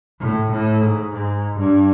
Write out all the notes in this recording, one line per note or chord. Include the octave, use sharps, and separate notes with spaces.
A2
A2
G#2
G#2
G2